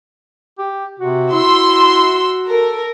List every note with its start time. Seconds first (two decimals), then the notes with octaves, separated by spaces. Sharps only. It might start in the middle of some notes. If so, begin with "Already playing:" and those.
0.58 G4
0.99 C3 F#4
1.32 E4 C6 E6
2.47 A4 A#4